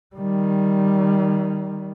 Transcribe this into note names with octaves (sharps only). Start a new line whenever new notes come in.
D#3 G3